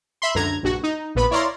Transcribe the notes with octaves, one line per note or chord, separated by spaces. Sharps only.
E5 B5 C6
C#2 F#2 D3 A#5 G#6
A#1 G2 F#4
D#4
A#1 A#2 B3 B4 B5
E4 C#5 D5 F5 A#5 C6